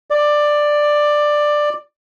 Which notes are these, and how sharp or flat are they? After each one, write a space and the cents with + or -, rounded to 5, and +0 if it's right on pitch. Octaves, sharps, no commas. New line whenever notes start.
D5 +10